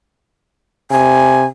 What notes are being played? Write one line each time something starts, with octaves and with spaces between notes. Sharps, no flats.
C3 G#5